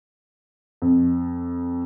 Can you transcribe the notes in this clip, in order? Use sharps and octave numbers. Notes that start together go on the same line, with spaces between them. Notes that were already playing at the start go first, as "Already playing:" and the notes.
F2